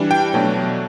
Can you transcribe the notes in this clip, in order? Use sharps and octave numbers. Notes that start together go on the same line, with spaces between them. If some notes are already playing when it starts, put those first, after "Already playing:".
Already playing: E3 G3 D4
G5
B2 F#3 A3 D4